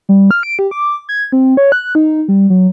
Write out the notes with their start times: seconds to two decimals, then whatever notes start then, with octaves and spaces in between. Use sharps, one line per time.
0.09 G3
0.31 F6
0.43 D7
0.59 G4
0.71 D6
1.09 G#6
1.32 C4
1.57 C#5
1.72 F#6
1.95 D#4
2.28 G3
2.50 F#3